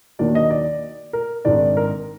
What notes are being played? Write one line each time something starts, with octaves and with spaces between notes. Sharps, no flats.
D#2 D#3 F#3 A#3 D4 D5
D#5
D5
A#4
G#1 G#2 D#3 G#3 D4 D5
A#4